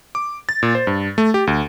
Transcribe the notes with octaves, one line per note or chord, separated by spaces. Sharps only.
D6
A6
A#2
C5
G2
A3
G4
D2